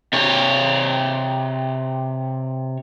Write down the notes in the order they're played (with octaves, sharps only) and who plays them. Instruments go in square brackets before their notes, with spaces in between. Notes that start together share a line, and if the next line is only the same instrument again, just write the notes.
[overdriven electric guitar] C3 C#5